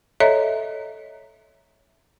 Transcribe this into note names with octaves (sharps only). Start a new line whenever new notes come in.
A4 C#5 D#5 E5 A#5